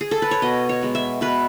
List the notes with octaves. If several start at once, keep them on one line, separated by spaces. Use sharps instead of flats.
G#4
A4
B4
C#5
B2 D#5
C#5
G#3 B3
E5
B2 B4